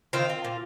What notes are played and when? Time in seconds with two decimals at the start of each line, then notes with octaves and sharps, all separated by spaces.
0.13 D#3 C4 F4
0.30 C4
0.45 A#2